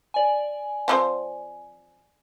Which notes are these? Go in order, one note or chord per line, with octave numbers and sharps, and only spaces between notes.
D5 G#5
F3 C4 C5